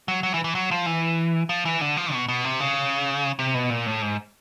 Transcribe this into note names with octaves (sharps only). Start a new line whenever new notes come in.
F#3
F#3
E3
E3
F#3
F3
E3
F3
E3
D3
F3
B2
B2
C3
C#3
C3
B2
A#2
A2
G#2